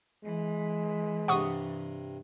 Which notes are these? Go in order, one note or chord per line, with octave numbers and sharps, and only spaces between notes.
E3 G#3
G2 C3 F#5 C#6 D#6